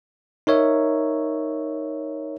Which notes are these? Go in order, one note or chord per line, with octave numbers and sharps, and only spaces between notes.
D#4 A#4 C#5 E5